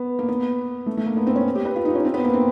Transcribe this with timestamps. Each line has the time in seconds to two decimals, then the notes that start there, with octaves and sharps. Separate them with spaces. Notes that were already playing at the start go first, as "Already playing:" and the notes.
Already playing: B3
0.19 A#3
0.29 B3
0.86 A3
0.97 A3
1.06 A#3
1.17 B3
1.27 C4
1.36 C#4
1.55 G4
1.65 B4
1.76 F4
1.85 D#4
1.95 C#4
2.05 C4
2.14 B3
2.25 A#3
2.34 C4